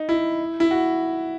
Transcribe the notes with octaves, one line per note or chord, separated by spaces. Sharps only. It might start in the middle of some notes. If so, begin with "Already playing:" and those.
Already playing: D#4
E4
E4
F#4